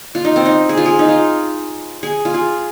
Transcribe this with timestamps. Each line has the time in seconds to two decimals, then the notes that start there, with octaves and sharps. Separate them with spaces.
0.15 F4
0.25 D#4
0.36 C4
0.46 D#4
0.69 G#4
0.77 F4
0.86 G#4
0.99 D#4
1.08 F4
2.03 G#4
2.25 F4
2.34 G#4